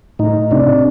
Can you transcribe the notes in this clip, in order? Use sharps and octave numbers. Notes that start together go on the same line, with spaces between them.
A2 D#4
C3 D4